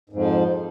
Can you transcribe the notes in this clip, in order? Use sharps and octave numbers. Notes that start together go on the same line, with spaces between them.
F2 G#2 F3